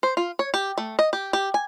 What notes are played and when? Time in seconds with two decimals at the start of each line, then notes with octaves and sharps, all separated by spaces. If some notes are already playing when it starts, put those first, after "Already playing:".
0.03 C5
0.17 F4
0.39 C#5
0.54 G4
0.78 A3
0.99 D#5
1.13 G4
1.33 G4
1.54 G#5